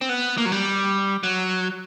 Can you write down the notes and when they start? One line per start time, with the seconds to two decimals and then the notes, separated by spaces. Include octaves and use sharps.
0.01 C4
0.09 B3
0.38 A#3
0.45 F#3
0.52 G3
1.23 F#3